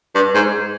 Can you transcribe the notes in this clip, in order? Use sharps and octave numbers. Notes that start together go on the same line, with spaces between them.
G2
G#2